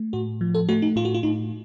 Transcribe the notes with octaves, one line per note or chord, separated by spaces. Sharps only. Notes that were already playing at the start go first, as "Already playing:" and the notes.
Already playing: A3
A2 F#4
F3
A4
A3 F#4
D#4
A2 F4
F#4
F4
A2 D#4